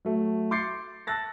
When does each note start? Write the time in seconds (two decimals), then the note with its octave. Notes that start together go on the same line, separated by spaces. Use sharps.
0.05 F#3 A3
0.51 C6 D6 G6 A6 C7 C#7
1.07 A5 E6 F#6 A6 A#6